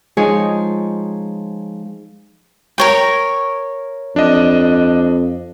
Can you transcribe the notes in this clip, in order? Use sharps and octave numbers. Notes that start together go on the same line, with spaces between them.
F3 G#3 D#4 G#4 C#5
A#4 C#5 G5
F2 D4 D#5